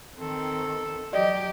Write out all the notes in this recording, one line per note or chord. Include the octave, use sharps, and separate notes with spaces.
D#3 C4 A4
F#3 G4 D5 D#5